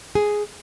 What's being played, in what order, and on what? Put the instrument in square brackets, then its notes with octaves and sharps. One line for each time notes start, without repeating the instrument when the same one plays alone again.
[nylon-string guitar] G#4